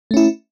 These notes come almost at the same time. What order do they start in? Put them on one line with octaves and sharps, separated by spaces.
A3 C#4 E4